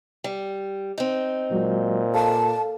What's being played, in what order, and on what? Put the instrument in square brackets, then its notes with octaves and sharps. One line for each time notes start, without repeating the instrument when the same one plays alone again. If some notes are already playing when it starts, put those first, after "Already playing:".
[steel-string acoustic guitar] G3
C4 D#4
[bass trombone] A#2 [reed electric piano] F#3 G#3 F#4
[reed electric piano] A4 F5 [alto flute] A5